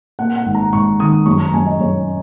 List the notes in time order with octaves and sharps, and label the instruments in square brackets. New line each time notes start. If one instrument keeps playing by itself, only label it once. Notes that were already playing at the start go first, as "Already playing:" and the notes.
[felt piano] A#3 F#5
F#5
G#1
A#5
G#1 C#6
D#3 D#6
F#2 C#6
A#5
F#2 G#5
D#5
F#2 C#5